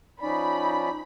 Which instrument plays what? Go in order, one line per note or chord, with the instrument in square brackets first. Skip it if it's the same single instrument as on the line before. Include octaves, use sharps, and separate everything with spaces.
[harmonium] F3 C#4 D5 [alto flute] D#4 [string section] B5